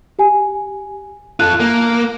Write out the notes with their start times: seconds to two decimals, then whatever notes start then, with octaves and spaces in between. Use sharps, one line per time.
0.19 G4 G#5
1.40 F4 A4 F#6
1.60 A#3